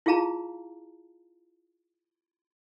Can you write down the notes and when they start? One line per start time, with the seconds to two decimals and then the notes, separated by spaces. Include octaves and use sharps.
0.06 E4 F4 G#4 F5 A5 A#5